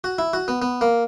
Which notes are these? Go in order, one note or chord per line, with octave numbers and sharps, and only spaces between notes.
F#4
E4
F#4
B3
B3
A#3